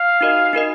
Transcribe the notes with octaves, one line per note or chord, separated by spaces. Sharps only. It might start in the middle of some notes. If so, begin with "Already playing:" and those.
Already playing: F5
D#4 F#4 A#4 D#5
D#4 F#4 A#4 D#5